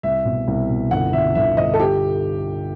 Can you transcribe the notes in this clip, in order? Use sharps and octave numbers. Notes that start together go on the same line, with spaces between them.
C2 E5
B2
C2
B2
G1 F#5
G1 E5
G1 E5
G1 D#5
A4
G4